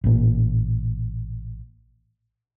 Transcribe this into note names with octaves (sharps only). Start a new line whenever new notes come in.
A1 A#2